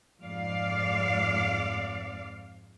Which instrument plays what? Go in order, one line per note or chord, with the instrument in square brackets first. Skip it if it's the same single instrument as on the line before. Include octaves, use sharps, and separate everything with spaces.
[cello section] F2 G#2 G#3 D5 F5